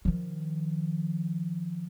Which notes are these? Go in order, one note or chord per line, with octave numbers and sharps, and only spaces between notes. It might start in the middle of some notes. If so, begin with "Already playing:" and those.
D#3 F3